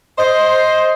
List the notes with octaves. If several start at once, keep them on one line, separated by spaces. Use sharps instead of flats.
C5 D#5